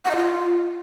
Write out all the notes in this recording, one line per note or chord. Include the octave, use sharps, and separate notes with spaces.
F#5
D#5
F4